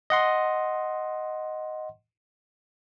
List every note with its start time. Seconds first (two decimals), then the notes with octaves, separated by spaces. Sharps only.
0.10 D#5 F#5 C6